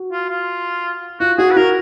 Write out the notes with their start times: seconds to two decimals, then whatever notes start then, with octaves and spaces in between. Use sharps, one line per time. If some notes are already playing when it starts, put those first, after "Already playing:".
Already playing: F#4
0.12 F4
0.29 F4
1.20 F4 F#4
1.38 F#4 G#4
1.51 B4
1.56 F#4 A#4